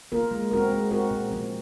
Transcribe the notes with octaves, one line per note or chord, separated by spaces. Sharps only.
A#3 F4 A#4
G#3
C4 F#4 A#4
G#3
C4 F#4 A#4
A#2
F3 C4